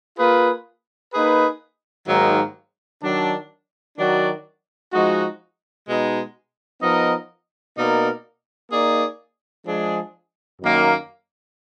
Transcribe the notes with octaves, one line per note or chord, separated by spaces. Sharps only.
A#3 F4 G#4 B4
A#3 D#4 G#4 B4
G#2 D#3 F#3 A#3 D#4
D#3 F#3 D4
D#3 F#3 D4 F#4 D5
F3 G#3 D#4 F#4
B2 G#3 D#4
F3 B3 D#4 A#4 D#5
B2 A#3 D#4 A#4 D5
A#3 D#4 G#4 D5
F3 G#3 D4 G#4
F#2 D#3 A#3